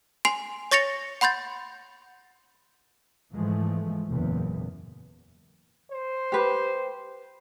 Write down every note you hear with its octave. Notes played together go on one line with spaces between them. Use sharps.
G#5 C6 C7 F7
C#5 C#6 A6 A#6 C#7 F7
F#5 B5 C6 G6 A6
G#2 E3 F3 G#3 A3
F#1 E2 A#2
C5
G4 B4